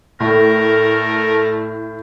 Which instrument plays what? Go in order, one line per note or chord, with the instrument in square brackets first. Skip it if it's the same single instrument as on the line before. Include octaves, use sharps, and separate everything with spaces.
[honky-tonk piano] A2 [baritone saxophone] A3 [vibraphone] A4 D5 [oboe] A#4